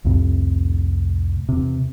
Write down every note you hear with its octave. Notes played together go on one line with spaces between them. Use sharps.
C2 F2 A2 C3
E2 C3